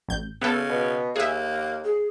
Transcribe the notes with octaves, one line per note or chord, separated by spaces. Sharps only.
A1 G6
C#3 B3 A4
B2
D#2 A#3 G#4 E5
G#4